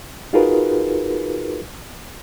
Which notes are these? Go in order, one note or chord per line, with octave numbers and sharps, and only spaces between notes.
D#4 F4 F#4 G#4 A#4 B4